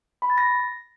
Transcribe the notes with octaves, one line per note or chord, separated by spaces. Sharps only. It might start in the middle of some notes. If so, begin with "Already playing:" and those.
B5
A6
A#6